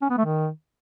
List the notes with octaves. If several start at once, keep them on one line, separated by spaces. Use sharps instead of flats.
C#4
B3
A3
D#3